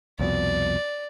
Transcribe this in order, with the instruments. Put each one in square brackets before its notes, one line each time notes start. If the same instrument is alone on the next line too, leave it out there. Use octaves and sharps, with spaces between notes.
[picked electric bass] C2 F2 B2 [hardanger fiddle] D5